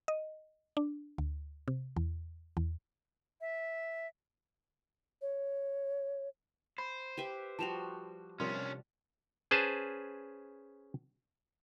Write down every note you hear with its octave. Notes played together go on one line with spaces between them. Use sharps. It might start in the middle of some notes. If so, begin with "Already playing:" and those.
D#5
D4
D2
C3
E2
E2
E5
C#5
C5 B5
G4 B4 E5
F3 G3 F#4 A5 E7 F7
C3 F3 G3 C#4 D4 A#4 C6
C#4 G#4 B4 C5 A5